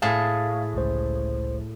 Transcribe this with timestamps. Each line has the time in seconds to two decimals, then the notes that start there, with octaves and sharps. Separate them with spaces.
0.02 A2 G#4 F5 A5
0.74 G1 C#2 C5